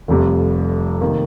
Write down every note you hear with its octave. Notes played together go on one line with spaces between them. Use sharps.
F1 F2 C3 G3
C3 D#3 A#3